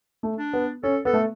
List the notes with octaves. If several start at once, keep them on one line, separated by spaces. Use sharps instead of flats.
A3
D4
B3
C#4 A4
B3 A4
A3